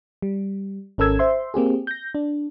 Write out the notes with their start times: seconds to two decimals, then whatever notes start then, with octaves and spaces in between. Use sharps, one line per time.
0.22 G3
0.98 G#1 C#4 A4 A#4 E6 G#6
1.19 C5 E5 C6
1.54 A#3 C4 G4 G#4
1.87 G6 A#6
2.15 D4